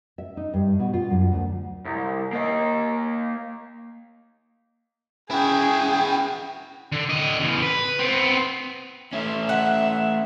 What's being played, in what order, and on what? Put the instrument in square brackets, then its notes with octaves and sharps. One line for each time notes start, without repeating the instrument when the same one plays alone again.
[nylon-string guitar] E5
D#4
G2
B2
F4
F#2
D2
[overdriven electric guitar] C2
A#3 D#5
[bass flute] C#4 [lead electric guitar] E4 F#4 [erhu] G#4 [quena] G5
[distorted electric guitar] D3
D3 D#5
E2 C#3
B4
B3 C4
[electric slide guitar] A3 C#4 [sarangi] E5
[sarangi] E5 [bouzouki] F#5